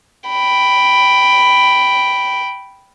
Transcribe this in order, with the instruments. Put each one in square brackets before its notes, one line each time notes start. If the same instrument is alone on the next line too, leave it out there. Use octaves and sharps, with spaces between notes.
[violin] G5 B5